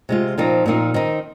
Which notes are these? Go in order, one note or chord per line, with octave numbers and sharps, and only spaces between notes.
C3 G#3 F4
A#2 F3 C4 D#4
A#2 F3 C4 D#4
D#3 C4 D#4